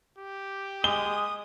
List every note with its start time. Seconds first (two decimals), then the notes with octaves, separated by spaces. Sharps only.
0.18 G4
0.84 G#3 D#6 G7